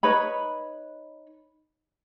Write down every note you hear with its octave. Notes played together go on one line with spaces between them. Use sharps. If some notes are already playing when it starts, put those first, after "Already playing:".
D#4 B4 C#5 B5